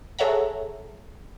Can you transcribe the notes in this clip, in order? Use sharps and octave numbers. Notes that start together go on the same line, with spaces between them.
G#4 A4 C#5 E5 F#5 A#5